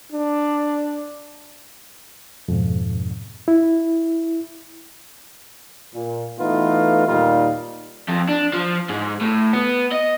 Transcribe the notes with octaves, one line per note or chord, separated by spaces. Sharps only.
D4
F2 G#2 B2
E4
A#2
E3 A3 B3 D#4 F4
D#2 A#2 G3 D#4 F4
F2
D4
F3
G#2
A2
B3
D#5